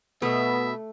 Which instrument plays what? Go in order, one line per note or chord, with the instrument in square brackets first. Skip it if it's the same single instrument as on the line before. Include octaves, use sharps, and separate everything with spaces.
[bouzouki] B2 D#5 [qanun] A3 [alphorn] B3 [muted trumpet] E5